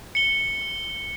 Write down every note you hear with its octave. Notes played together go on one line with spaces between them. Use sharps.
C#7 G7